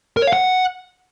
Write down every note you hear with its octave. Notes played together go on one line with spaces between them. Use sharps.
A#4
C#5
F5
F#5